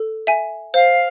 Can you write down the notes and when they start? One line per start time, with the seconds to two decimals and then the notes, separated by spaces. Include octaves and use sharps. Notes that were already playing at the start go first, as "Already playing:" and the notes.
Already playing: A4
0.27 E5 G#5
0.74 C5 F5